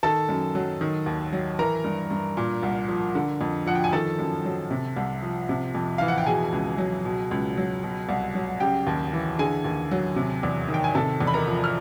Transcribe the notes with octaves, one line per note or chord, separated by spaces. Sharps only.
D#3 A4 A5
F#2
F#3
D#3
D#2
F#3
E3 A#4 A#5
G2
G2
A#2
C2
F3
D3
F2
F3 F#5
G5
G#5
D#3 A4 A5
F#2
F#3
C3
C2
F3
C3
F2
E3 F5
F#5
G5
B2 G#4 G#5
C#2
F#3
B2
C#2
F#3
B2
C2
F#3
C#3 G4 G5
D#2
E3
D3 G#4 G#5
D#2
F#3
C3
E2
D#3
G5
G#5
C3 A4 A5
E2
B5
A#4 A#5
F3
F6